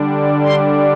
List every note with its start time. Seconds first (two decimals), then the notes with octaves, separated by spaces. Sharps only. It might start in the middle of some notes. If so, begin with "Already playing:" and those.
Already playing: D3 G3 D4
0.45 C6